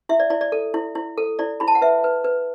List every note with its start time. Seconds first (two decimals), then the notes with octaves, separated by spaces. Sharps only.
0.09 E4 E5
0.20 D5
0.30 E4 D5
0.41 D5
0.52 A4
0.74 E4
0.95 E4
1.18 A4
1.39 E4 D5
1.60 E4 B5
1.68 A5
1.75 F#5
1.81 B4 E5
2.04 B4
2.24 B4